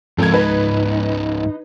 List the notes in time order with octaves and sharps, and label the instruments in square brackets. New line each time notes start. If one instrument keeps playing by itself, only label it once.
[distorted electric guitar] C#2 G#2 [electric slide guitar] F3 C4 A#4 [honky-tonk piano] A4 G#6
[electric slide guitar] D#4 [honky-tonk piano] B4